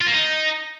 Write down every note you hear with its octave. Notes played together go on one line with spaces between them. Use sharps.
F4
A#3
D#4